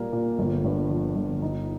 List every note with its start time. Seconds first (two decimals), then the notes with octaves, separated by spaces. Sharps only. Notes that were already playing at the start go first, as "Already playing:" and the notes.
Already playing: A#2 G3 A#3
0.12 A#2
0.39 G1
0.65 G2
0.89 F3
1.16 G1
1.42 D#4